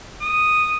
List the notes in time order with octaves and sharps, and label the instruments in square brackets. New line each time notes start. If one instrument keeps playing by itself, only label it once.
[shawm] D#6